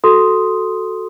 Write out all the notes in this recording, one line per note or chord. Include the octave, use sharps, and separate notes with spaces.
F#4 A4 C6 D#6